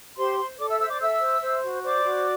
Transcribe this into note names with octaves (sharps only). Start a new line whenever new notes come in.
G4 C5 C6
C5
A4 D5 D6
E5 E6
C5 E5 E6
D5 D6
A4 E5 E6
C5
C5
F#4
C5 D5 D6
F#4